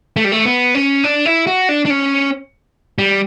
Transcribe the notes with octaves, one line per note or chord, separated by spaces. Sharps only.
A3
G3
A3
B3
C#4
D4
E4
F#4
D4
D4
C#4
G3